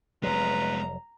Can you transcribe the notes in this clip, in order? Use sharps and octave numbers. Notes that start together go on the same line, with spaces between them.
F1 F#3 G#3 B3 B4 A#5